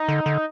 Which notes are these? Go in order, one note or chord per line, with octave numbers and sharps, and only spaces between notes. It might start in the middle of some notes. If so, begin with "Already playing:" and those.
Already playing: D#4
D3
D3